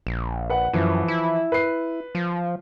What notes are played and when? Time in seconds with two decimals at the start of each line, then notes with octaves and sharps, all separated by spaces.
0.07 A#1
0.50 B4 F#5
0.73 F#2 E3 F3
1.08 E4
1.52 B4 C7
2.15 F3